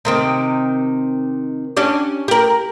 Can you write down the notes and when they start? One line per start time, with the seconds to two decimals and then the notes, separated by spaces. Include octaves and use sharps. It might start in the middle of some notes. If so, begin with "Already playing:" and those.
0.05 C3 D#3 C4
1.77 C#4 D4 G4
2.28 G4 A#4